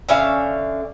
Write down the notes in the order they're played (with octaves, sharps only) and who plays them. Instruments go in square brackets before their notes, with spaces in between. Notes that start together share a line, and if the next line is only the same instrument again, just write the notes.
[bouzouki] D3 C#4 E5 F5